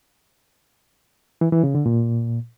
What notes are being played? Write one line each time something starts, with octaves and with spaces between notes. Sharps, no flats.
E3
E3
C#3
D3
A#2